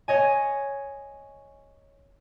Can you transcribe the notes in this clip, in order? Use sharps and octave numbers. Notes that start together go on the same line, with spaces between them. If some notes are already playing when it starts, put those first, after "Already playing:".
C#5 D#5 G#5